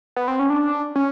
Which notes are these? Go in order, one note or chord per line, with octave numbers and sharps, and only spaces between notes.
B3
C4
C#4
D4
C#4